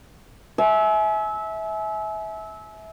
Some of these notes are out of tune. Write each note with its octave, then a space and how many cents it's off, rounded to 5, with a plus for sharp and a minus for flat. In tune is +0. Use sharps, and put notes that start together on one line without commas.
E5 -20 G#5 +35